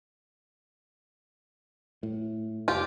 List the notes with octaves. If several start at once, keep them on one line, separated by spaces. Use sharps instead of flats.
A2
F1 F4 G4